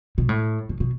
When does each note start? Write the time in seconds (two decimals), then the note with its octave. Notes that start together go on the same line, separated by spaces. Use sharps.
0.18 B2
0.29 A2
0.69 B2
0.80 B2